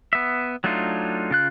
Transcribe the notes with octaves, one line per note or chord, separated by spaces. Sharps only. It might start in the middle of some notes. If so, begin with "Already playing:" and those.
B3 E5
F#3 A3 D4 D#4 F4
C#3 F4 F#6